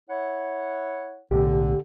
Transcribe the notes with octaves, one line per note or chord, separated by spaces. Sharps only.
E4 C#5 F#5
B1 A2 D3 G4